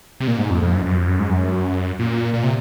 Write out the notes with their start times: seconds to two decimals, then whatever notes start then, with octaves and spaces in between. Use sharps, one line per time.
0.20 C3
0.28 A#2
0.39 G#2
0.50 F2
0.62 F2
0.73 F#2
0.85 F#2
0.96 F2
1.08 F#2
1.19 G#2
1.30 F#2
1.99 A#2
2.34 A#2
2.43 C3